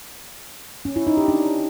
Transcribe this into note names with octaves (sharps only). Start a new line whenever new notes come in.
C#4
E4
D#4
G4
D4